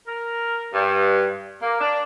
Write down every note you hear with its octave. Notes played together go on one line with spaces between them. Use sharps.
A#4
G2
A#3
D4